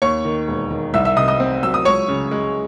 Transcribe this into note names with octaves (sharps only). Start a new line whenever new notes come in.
D#2 C#5 C#6
D#3
E1
D#3
C2 E5 E6
E5 E6
C3 D#5 D#6
D#5 D#6
C4
F#3 E6
D#6
C#2 C#5 C#6
C#3
G#3